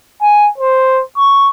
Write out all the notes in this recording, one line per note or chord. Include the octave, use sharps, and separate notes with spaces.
G#5
C5
C#6